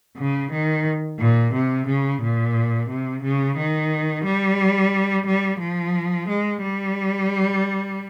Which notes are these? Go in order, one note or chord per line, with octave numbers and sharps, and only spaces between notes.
C#3
D#3
A#2
C3
C#3
A#2
C3
C#3
D#3
G3
G3
F3
G#3
G3